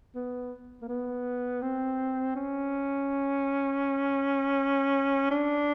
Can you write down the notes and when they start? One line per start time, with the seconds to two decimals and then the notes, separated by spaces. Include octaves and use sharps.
0.15 B3
0.81 A#3
0.89 B3
1.62 C4
2.36 C#4
5.31 D4